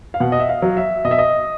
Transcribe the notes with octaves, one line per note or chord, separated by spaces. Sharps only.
F5
B2 F#5
D#5
E5
F5
F#3
E5
B2 D#5
E5
D#5